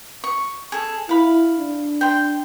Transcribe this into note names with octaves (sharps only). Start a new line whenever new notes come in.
C#6
G#4 A4
E4 F5 B5
D4
G5 C6